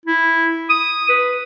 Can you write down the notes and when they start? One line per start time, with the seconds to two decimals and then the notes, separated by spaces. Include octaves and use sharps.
0.05 E4
0.70 D#6
1.09 B4